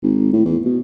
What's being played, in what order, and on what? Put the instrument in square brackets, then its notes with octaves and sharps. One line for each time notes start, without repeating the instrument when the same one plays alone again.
[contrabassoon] G#1
A2
E2
B2